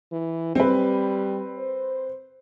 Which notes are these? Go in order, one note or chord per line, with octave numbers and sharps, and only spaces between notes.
E3
G3 C4 B4
C5